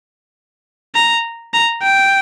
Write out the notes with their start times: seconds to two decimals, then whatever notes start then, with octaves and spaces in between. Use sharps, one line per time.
0.95 A#5
1.54 A#5
1.82 G5